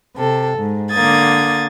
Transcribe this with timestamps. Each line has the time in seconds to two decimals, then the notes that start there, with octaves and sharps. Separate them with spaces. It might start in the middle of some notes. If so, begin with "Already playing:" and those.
0.17 C3 A4
0.59 G#2
0.91 D3 A#3 D#6 G#6 A6